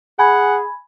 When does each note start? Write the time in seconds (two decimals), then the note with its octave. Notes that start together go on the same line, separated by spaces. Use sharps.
0.19 G#4 F#5 G#5 B5 G#6